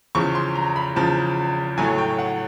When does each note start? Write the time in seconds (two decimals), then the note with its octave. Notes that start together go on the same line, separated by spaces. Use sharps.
0.15 E2 C#3 F3 C#6
0.35 C6
0.55 A#5
0.76 B5
0.96 E2 C#3 F3 A5
1.78 A2 F#3 A3 G#5
1.98 G5
2.18 F#5